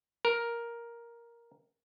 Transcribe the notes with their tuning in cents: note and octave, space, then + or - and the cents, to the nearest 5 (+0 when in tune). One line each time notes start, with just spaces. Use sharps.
A#4 +5